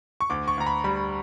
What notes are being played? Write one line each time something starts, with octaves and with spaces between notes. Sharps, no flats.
C#6
D2 D6
C#6
D2 A#5
B5
G3 B5